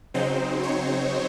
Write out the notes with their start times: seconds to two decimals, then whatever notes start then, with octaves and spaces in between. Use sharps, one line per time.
0.14 C#3 F#3 C4 D#4 C5
0.63 C#5